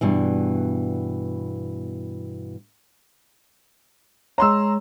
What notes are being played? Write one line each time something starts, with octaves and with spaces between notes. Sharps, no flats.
G2 B2 E3
G#3 C#5 A#5 C6 E6